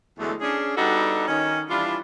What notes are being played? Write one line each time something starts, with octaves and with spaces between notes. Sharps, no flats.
E2 D3 F#3 G#3 A3
C#4 D4 G#4
G3 B3 D4 D#4 F#4 A4
D#3 C#4 D#4
E3 G3 D4 E4 F4